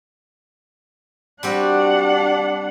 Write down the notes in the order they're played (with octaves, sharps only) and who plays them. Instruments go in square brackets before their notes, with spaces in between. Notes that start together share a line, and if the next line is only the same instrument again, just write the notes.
[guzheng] G3 C4 F#4 [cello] D4 F#5